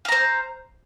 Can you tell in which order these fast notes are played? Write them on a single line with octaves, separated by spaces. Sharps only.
F5 A#5 C5